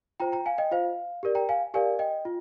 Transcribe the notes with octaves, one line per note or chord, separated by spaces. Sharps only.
F4 C5 G5 A#5
G5 A#5
F5 G#5
D#5 G5
F4 C5 F5
G4 A#4 D5
G5 A#5
F5 G#5
G4 A#4 D5 F5 G#5
D#5 G5
F4